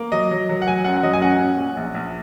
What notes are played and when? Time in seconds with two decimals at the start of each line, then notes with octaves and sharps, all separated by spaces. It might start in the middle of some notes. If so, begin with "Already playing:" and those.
Already playing: A#3
0.12 F#3 D#5
0.31 F#3
0.49 F#3
0.62 F#5
0.67 F#3 G#5
0.85 F#2 F#5
0.96 F#5
1.03 F#3 D#5
1.13 G#5
1.21 C#4 F#5
1.39 C#4
1.57 A#2
1.77 A#1
1.94 A#1